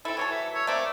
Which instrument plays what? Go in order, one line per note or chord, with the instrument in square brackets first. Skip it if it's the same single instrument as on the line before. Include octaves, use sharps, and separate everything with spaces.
[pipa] C4 E4 [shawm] A4
[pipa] E3 F#3 A4 [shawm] C#5
[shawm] E5
[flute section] A#4 E6 [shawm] C#5
[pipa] A3 A#3 C4 [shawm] D5